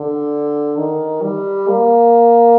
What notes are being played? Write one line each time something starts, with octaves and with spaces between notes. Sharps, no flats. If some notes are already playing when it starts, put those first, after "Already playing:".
Already playing: D3
D#3
G3
A#3